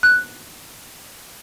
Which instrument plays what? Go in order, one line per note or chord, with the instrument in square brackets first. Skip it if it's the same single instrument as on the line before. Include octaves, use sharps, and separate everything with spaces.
[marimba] F#6